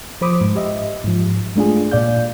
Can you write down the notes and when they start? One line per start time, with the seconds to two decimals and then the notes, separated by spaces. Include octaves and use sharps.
0.21 F3 C5 B5 D6 D#6
0.41 G#2
0.55 G4 D#5 E5
1.04 G#2 F3
1.56 G#3 A3 D4 F4 G#4
1.91 A#2 D5 F5 G6